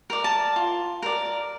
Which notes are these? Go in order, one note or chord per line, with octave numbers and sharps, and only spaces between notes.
A#4 D5
A5
F4
A#4 D5